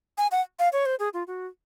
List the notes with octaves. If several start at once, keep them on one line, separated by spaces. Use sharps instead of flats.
G#5
F#5
F5
C#5
C5
G#4
F4
F#4